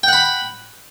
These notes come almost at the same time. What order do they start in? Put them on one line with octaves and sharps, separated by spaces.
G5 F#5 B5